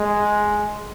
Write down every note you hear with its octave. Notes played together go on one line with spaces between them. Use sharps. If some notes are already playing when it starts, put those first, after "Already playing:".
Already playing: G#3